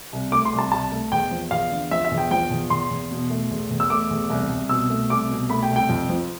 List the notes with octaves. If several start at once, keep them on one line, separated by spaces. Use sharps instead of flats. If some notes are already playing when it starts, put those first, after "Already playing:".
C2
A3 D6
C6
C2
A5
C2 A5
A3
E2 G5
F3
E2 F5
D3
F3 E5
E5
E2
G5
F3 G5
E2
E2 C6
E2
B2
A3
E2
E2
E6
A3 D6
E2
C2
C2
B2 E6
A3
C2 D6
B2
A3 B5
G5
C2
G5
F2
F3